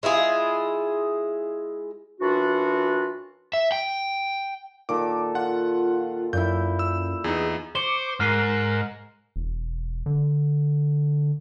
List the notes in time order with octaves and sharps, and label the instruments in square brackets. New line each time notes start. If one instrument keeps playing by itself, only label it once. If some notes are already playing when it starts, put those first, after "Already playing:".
[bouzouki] G#3 E4 F4 G#4
[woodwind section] F#2 E3 D4 F4 F#4
[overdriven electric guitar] E5
G5
[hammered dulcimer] A#2 D#3 A4 [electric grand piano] D6
[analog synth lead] F4 [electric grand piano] F#5
[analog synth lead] F#2 [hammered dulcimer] A#2 E4 [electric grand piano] G6
[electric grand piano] E6
[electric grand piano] E2 D#4 [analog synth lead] G#4
[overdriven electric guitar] C5 [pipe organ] C#6 D6 [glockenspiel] G7
[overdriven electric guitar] G#2 [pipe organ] A#4 F#6 [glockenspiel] F6 C7 D#7
[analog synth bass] E1
D3